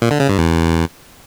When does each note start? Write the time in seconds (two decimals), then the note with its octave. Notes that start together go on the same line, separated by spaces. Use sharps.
0.02 A#2
0.11 D3
0.20 C#3
0.29 G2
0.38 E2